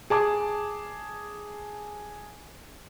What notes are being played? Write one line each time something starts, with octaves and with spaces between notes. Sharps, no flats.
G#4 A5 D6